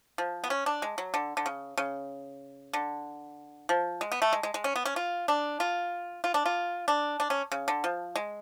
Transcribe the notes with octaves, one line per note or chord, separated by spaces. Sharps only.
F3
B3
C#4
D4
G#3
F#3
D3
D3
C#3
C#3
D3
F3
G#3
B3
A3
G#3
G#3
G#3
C#4
B3
C#4
F4
D4
F4
F4
D4
F4
D4
D4
C#4
C#3
D3
F3
G#3